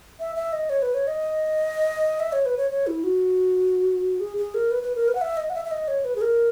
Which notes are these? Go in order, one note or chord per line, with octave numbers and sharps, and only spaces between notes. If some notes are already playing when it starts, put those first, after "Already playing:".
E5
E5
D#5
C#5
B4
C#5
D#5
E5
C#5
B4
C#5
C#5
E4
F#4
G#4
G#4
A#4
B4
B4
A#4
B4
F#5
E5
D#5
F#5
E5
E5
D#5
C#5
B4
G#4
A#4